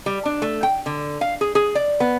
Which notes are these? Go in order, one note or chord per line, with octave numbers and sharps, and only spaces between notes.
G3
D4
A3
G5
D3
F5
G#4
G#4
D5
B3